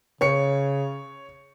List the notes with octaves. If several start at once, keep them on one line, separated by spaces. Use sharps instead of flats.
C#3 C#5 C#7